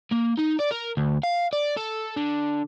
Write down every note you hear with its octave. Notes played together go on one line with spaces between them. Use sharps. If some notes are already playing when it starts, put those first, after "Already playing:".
A#3
D#4
D5
A#4
D2
F5
D5
A4
D3